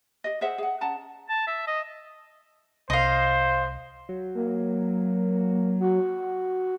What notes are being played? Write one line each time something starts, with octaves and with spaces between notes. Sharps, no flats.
G4 D#5
G#4 C5 E5 F#5
G#4 F#5
C#4 F#5 A5 A#5
A5
E5
D#5
C2 C5 D#5 F5
F#3
A#3
F#4